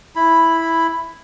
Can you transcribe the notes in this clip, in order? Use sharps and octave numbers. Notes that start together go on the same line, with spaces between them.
E4 B5